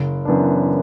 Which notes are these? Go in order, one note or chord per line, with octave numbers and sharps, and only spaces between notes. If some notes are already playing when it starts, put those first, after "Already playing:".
Already playing: F#1
F#2 E3 B3 D4